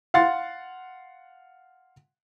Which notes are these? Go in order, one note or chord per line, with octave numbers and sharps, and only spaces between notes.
F5 F#5 C6 A6